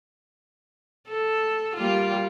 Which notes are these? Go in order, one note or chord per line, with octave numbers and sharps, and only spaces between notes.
A4
G3 A#3 F4